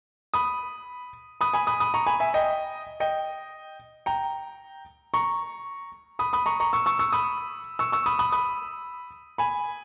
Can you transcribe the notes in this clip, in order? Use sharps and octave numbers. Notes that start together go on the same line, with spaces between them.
B5 D#6
B5 D#6
G#5 B5
B5 D#6
B5 D#6
A#5 C#6
G#5 B5
E5 G#5
D#5 G5
D#5 G5
G5 A#5
A#5 C#6
B5 D#6
B5 D#6
A#5 C#6
A#5 C#6
C#6 E6
C#6 E6
C#6 E6
B5 D#6
C#6 E6
C#6 E6
B5 D#6
B5 D#6
B5 D#6
G#5 B5